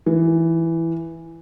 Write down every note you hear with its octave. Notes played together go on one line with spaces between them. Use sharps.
E3